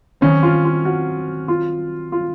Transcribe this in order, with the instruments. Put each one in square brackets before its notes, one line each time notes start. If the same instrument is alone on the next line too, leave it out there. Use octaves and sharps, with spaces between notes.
[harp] D#3 F#3 C4 D#4 [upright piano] C#4
[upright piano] F4
F4
F#4
F4
F4